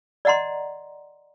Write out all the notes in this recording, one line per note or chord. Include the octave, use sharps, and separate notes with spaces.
D5 D#5 F#5 A#5 C6